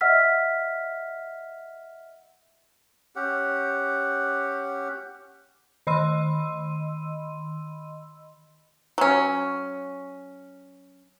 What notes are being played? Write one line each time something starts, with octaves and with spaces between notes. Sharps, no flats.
D#5 E5 F#5 E6 F6 B6
C#4 G4 F#5
D#3 D#5 B5 C6 E6 D#7
F#3 C#4